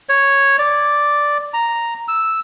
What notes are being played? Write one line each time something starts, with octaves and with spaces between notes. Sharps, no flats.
C#5
D5
A#5
E6